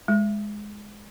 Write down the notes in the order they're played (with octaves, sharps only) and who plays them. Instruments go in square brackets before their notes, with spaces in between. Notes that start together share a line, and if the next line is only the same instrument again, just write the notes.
[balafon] G#3